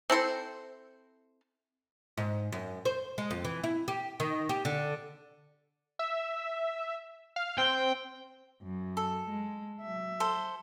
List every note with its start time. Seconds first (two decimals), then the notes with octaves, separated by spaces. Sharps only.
0.10 C4 E4 A4 C5
2.17 G#2
2.52 F#2
2.85 C5
3.18 G#3
3.31 F2
3.45 E3
3.64 E4
3.88 G4
4.20 D#3
4.49 G4
4.65 D3
5.99 E5
7.36 F5
7.58 C4 G5
8.63 F#2
8.97 A4
9.29 G#3
9.81 F#3 E5
10.20 A4 C5